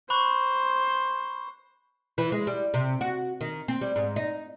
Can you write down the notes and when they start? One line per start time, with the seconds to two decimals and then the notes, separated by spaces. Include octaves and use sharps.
0.10 C5 B5 C#6 F#6
2.18 E3
2.32 G#3
2.47 G3
2.74 C3
3.01 F#4
3.41 D#3
3.68 C4
3.81 G3
3.96 G#2
4.16 D#4